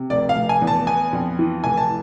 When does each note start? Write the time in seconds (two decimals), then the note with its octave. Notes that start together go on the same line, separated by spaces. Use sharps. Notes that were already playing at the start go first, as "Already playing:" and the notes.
Already playing: C3
0.10 F1 D5
0.29 F5
0.35 F1
0.49 G#5
0.62 E2
0.67 A5
0.87 B3 G#5
1.13 F2
1.39 E3
1.64 F1 G#5
1.77 A5